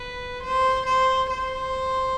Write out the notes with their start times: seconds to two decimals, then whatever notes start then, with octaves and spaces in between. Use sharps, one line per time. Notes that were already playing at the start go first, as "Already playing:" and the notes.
Already playing: B4
0.43 C5
0.86 C5
1.30 C5